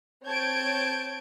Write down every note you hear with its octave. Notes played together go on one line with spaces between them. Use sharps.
C4 C#5 A5 G6 G#6 D7